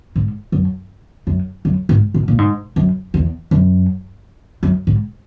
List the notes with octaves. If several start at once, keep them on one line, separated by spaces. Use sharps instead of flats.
G#2
F#2
F#2
F#2
G#2
G#2
A#2
G#2
F#2
E2
F#2
F#2
G#2